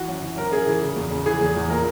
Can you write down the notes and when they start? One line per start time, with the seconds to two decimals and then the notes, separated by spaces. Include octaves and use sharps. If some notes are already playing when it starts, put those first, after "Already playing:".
Already playing: E3 F#4
0.08 F#2
0.22 E3
0.37 F#2 A#4
0.52 F#2 G#4
0.67 E3
0.82 C#3
0.96 E2
1.11 C#3
1.26 E3 G#4
1.41 E2
1.56 E2
1.70 A#2 A#4